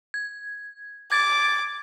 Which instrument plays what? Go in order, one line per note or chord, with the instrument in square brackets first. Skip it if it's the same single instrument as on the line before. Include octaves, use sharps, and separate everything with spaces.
[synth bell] G#6
[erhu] D6 [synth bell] G#6 A6